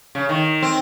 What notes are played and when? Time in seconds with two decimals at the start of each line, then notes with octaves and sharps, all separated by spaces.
0.15 C#3
0.29 D#3
0.62 C4